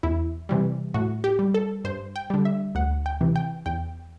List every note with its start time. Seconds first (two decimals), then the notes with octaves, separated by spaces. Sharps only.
0.03 E2 E4
0.49 C3 E3 G3
0.94 A2 F#4
1.24 G4
1.39 G3
1.54 A4
1.84 G2 C5
2.16 G5
2.30 D3 G3
2.45 E5
2.75 D2 F#5
3.06 G5
3.21 C3 E3
3.36 G5
3.66 E2 G5